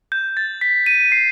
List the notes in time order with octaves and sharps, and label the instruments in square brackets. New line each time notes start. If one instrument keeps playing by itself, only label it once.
[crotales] G6
A6
B6
D#7
C7